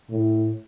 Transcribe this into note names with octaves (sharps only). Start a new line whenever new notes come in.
A2